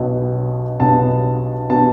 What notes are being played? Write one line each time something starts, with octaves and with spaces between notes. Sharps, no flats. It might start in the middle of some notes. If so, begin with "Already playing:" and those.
Already playing: B1 B2 B3
B1 B2 B3 A5
B2 B3 A5